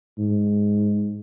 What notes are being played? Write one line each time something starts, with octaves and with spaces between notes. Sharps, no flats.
G#2